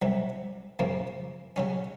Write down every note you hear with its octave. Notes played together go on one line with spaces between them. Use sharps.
C2 C3 F#3
F#2 C#3 F3 A#3
C#3 F#3 C#4